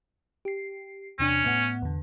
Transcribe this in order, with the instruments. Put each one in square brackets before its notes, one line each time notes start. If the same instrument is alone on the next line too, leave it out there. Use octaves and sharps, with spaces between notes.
[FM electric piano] G4 C7
[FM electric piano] E2 C3 D4 [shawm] C#4
[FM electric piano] A2 B3 F#5
E2 D3